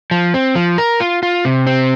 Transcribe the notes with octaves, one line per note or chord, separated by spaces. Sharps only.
F3
C4
F3
A#4
F4
F4
C3
C4